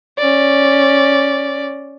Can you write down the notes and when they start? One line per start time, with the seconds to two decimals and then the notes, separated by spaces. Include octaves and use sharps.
0.18 C#4 D5